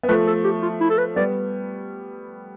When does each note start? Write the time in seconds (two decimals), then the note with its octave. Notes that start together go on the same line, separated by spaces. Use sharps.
0.03 B3
0.09 F3 A3 B4
0.27 A4
0.44 G4
0.62 F4
0.81 E4
0.90 A4
0.98 B4
1.16 G3 B3 D5